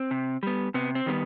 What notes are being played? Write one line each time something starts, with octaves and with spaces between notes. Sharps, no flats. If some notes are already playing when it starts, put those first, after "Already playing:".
Already playing: C4
C3
G3 B3
C3 B3
C4
D#3 G3 B3